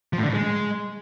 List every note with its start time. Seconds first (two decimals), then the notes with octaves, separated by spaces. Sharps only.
0.13 F3
0.18 A2
0.23 D3
0.28 A2
0.34 G#3